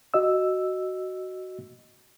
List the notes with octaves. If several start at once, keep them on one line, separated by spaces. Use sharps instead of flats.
F#4 D#5 E6